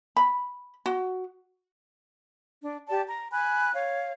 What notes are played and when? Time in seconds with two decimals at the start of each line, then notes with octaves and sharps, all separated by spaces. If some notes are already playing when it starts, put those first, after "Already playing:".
0.17 B5
0.86 F#4
2.61 D4
2.88 G4 D5 A5
3.09 A#5
3.31 G#5 B5 F#6
3.73 C#5 F5